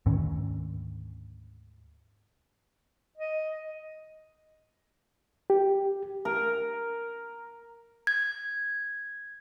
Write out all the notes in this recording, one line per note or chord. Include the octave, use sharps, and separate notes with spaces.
D2 G#2 D#3 C#4
D#5
G4
A#4
G#6